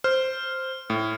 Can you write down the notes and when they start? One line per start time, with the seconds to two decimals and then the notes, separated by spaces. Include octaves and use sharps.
0.04 C5 F6
0.90 A2